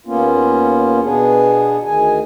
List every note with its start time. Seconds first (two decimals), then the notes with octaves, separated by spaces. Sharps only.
0.06 D#2 A#3 B3 C#4 F4
1.02 B2 B3 D4 G#4
1.84 D2 D#3 G#4 G#5